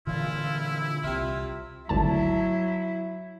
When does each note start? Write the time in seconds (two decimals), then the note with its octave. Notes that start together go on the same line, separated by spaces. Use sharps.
0.07 A#2 D3 E3 E4 F4
1.04 C2 C3 F4 E5
1.89 G#1 D2 F#3 E4 A5